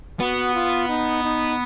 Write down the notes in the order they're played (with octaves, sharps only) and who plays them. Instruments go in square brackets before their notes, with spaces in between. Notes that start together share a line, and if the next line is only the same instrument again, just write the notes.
[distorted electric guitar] B3 [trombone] F#4
[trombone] F4
D#4
D#4